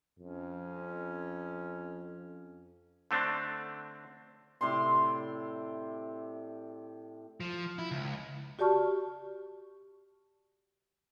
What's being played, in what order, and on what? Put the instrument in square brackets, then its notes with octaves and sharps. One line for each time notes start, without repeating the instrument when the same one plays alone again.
[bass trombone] F2 [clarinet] C#4
[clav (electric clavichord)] D3 A3 C4 D4
[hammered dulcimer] A2 C3 D5 C6
[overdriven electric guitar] F3
E4
C#2
[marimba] F#4 G4 D5 A5 C#6 F6